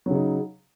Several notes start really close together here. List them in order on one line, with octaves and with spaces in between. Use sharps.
F#3 C#3 D#4